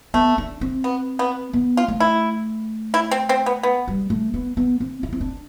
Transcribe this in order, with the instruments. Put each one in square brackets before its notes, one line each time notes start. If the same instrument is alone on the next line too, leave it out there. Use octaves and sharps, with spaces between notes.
[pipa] A3 [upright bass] B3
[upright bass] D4
C4
[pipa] B3
B3
[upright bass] B3
[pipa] F4
[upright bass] A3
[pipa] E4
E4
C4
C4
B3
B3
[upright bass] G3
A3
B3
B3
C4
E4
C4
D4